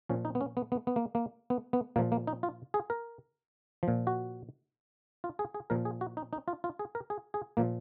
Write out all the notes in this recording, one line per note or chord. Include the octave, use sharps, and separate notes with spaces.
A#2 F3 C#4
D#4
B3
C#4
B3
B3
B3
A#3
A#3
B3
B3
A#2 F3 A#3
A#3
D#4
F4
G#4
A#4
F3
A#2
F#4
F4
G#4
G#4
A#2 F3 A#4
G#4
F#4
D#4
D#4
F4
F4
G#4
A#4
G#4
G#4
A#2 F3 A#3